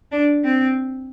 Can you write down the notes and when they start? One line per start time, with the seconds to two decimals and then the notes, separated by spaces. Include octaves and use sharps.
0.12 D4
0.44 C4